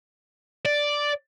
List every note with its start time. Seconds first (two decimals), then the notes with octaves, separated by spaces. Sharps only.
0.65 D5